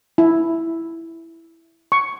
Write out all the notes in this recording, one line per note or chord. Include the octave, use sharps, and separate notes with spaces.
E4
C#6